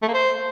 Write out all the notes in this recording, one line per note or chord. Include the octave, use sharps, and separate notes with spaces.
A3
A#3
C5